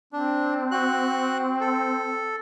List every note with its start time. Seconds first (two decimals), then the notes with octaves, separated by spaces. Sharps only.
0.13 C4 D4
0.71 F#4 F#6
1.61 A4